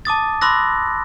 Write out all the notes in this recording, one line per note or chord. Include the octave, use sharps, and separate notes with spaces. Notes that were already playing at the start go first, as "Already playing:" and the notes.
A5 D6 D#6 A6
B5 C6 D6 E6 F#6 A#6